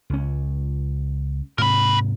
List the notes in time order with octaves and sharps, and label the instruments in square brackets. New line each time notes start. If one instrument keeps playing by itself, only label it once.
[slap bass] C#2 C#4
[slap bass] G#2 C3 [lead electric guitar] A#4 B5